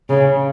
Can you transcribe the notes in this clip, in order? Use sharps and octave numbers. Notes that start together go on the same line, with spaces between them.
C#3